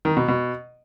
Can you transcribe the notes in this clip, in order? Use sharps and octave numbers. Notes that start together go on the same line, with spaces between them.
D#3
B2
B2